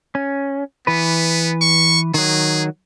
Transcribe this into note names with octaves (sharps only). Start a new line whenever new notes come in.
C#4
E3 B3 B4
C#6
D#3 F#3 G#4